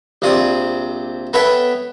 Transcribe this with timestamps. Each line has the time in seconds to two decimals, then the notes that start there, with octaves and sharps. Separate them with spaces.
0.22 A#1 C3 C4 D5 D#6
1.33 B3 A4 B4 C#5 E5 G5